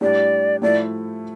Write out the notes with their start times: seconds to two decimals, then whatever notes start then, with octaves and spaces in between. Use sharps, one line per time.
0.01 A2 G3 D4 G4 D5
0.62 A2 F3 A3 E4 D5